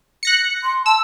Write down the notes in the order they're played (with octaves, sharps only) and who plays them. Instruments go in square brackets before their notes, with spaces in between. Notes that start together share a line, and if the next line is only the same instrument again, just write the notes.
[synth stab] F#6 A#6 C#7
[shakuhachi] C6
[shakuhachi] A5 [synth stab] E6